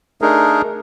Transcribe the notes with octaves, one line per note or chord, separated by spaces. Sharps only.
A3 D4 D#4 G#4 A#4